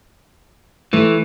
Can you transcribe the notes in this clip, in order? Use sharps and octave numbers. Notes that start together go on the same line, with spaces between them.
E3 A3